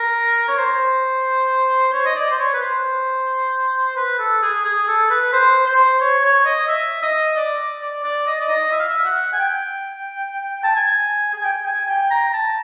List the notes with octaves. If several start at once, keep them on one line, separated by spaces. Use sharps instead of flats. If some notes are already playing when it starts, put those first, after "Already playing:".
Already playing: A#4
C#5
C5
C#5
D#5
D5
C5
C#5
B4
C5
B4
A4
G#4
G#4
A4
B4
C5
C5
C#5
C#5
D#5
E5
D#5
D5
D5
D5
D#5
D5
D#5
E5
F5
E5
F#5
G#5
G5
A5
G#5
G#5
G5
G#5
G5
A#5
A5